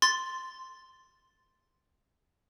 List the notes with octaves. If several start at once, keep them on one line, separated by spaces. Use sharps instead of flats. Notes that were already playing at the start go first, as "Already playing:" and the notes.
C6 A6